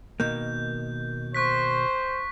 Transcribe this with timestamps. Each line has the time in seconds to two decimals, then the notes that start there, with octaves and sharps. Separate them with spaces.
0.20 B2 D#3 A#3 G6
1.35 C5 C#6 F#6 B6